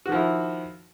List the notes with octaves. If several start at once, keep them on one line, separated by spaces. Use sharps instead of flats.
D#3 F3 E4 F#4